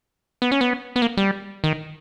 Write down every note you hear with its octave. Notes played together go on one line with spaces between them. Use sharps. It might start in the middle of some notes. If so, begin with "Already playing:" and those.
B3
C#4
B3
B3
A#3
G3
D#3